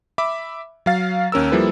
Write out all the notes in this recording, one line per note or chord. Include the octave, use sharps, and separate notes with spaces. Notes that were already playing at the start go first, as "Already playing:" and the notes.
E5 B5 D6
F#3 F5 A6
D#2 C#4 A#4 E6
F3 G3 A#3 E4 A4 B4